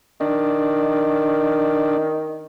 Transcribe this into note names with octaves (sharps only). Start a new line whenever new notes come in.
D#3 D4